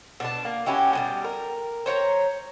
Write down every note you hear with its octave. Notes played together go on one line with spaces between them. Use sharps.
B2 D4 A5
A#3
C#4 E4 F#4 G4
B2 F#3 G3
A#4
C5 C#5 G5 A#5